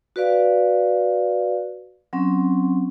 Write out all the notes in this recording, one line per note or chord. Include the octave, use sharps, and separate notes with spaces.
F#4 B4 D5 F5
F#3 C4 C#4